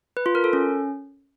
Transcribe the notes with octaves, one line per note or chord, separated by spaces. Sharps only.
B4
F4
A#4
A4
C#4